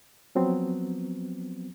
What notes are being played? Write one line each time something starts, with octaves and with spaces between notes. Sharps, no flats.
F3 F#3 B3 C4